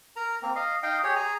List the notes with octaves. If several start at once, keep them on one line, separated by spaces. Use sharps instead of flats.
A#4 A#5
A#3 C4
D#5 F5
D#4 D#5 F5 G5
G4 G#4 C#5
G#4 G#5 A#5